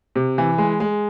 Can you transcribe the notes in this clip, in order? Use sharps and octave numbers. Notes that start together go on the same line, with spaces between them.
C3
E3
G#3
G#3